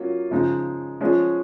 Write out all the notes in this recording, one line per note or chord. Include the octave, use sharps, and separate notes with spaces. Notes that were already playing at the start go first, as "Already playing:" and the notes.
Already playing: F#3 A#3 C#4 F4
C#3 F3 G#3 D#4
F3 G#3 C#4 F4 G#4